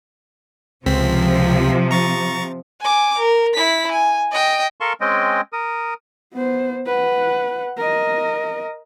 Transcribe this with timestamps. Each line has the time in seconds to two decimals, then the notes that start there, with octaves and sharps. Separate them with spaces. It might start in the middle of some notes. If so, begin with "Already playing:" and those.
0.86 C#2 C3 F3 C4 B6
1.91 A#5 C#6 A6
2.81 G#5 D6
3.19 A#4
3.54 E4 B6
3.91 G#5
4.32 D#5 G5
4.80 A4 A#4 F5 A5 C6 C#6
5.01 G#3 C4 C#4 D#5 G5
5.53 A#4 D#6
6.33 B3 C5
6.86 B4 F#5
7.78 A#4 D#5